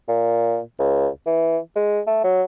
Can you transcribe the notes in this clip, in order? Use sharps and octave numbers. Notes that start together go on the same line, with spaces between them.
A#2
C#2
E3
G#3
A3
F#3